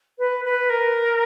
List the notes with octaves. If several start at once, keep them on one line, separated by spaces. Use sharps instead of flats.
B4
B4
A#4